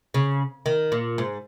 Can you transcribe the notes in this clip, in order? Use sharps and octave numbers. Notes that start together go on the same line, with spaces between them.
C#3
D#3
A#2
G#2